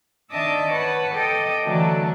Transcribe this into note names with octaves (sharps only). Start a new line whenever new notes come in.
D#3 D4 D#5 E5 A5 D6
B4 C#5 F#5 A5
A4 D#5 G5 D6
D3 E3 F#3 A3 D4